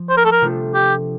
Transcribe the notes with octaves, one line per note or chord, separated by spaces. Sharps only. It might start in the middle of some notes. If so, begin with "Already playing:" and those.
Already playing: F3
C5
A#4
A4
A#4
C3 F3 A3 D4 F4
G4